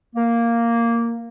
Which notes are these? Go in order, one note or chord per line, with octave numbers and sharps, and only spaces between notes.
A#3